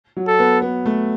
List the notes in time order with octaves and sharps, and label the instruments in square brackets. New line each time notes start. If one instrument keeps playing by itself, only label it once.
[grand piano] F#3
[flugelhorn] A4
[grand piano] B3
B3
A3